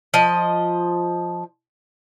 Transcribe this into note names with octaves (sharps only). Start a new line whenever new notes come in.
F3 D#5